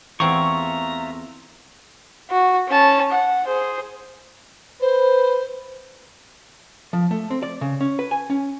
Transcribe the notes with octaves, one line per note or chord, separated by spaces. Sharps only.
E2 A3 C4 F4 E5 A#5 C#6
F#4
C#4 A5
F#5
G#4 C5
B4 C5
F3
A3
C4
D5
C#3
C#4
B4
G#5
C#4